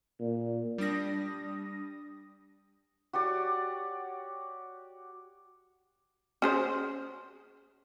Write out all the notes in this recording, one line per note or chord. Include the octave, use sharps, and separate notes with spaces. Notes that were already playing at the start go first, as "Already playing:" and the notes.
A#2
G3 D4 D#6 A#6
F#4 G4 C#5 D5
C#4 G#4 C5